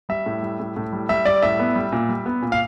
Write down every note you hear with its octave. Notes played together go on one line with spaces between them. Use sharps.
G3 E5
A2
G3
A2
A2
G3
G3 E5
G3 D5
A2 E5
B3
G3
A#2
G3
B3
A#2
F5